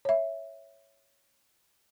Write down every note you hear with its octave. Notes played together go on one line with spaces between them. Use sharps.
C#5 E5